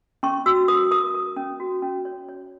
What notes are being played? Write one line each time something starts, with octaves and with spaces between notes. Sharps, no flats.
C#4 C#6
F#4 E6
A#4 D#6
A#4 D#6
A#4
C#4
F#4
C#4
C#5
C#5